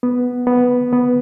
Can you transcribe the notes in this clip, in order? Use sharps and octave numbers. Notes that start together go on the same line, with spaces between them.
B3
B3
B3